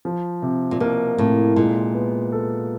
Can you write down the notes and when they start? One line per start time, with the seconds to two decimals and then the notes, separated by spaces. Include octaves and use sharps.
0.05 F3
0.42 C3
0.71 A#2
0.80 B2 A#3
1.18 A2 C3
1.56 A#2 G#3
1.94 B3
2.32 A4